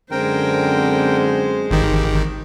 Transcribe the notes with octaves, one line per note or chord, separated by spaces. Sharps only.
F#2 D3 G#3 C4 A#4 C5 G5
G#1 D#3 G4